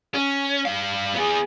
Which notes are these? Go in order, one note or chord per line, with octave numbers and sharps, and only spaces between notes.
C#4
G2 F5
B3 G#4